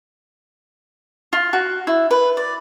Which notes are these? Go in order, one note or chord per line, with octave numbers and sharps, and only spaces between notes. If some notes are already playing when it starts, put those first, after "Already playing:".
F4
F#4
E4
B4
D5